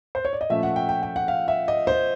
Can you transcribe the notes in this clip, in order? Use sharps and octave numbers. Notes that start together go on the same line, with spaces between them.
C5
C#5
D5
D#5
A#2 F3 A3 C#4 E5
F#5
G5
G5
G5
F#5
F5
E5
D#5
C5